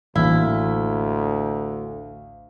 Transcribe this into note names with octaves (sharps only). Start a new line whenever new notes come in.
A1 D2 E3 A#3 E4 F5